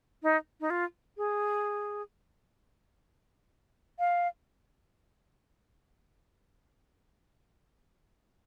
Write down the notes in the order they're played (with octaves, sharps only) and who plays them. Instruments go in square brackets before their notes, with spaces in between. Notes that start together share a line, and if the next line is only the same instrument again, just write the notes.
[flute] D#4
D#4
F4
G#4
F5